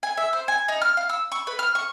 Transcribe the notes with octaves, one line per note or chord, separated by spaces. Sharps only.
G#5
E5
C5
G#5
D#4
F6
F5
E6
C#6
B4
F6
C#6